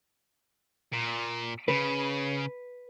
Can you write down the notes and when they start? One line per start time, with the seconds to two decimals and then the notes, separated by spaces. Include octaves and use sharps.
0.93 A#2
1.68 C#3 B4